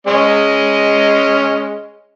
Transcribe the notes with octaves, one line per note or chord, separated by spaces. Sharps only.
G#3 C#4 D#5